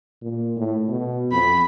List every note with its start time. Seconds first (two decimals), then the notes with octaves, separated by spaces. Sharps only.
0.22 A#2
0.57 A2
0.88 B2
1.32 F2 B5